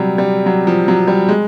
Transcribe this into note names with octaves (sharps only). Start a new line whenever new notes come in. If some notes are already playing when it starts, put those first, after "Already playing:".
Already playing: C3 F#3 G3
G3
F#3
F3
F#3
G3
G#3